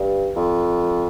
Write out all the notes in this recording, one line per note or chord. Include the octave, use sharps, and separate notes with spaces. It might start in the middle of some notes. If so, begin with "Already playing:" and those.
Already playing: G2
F2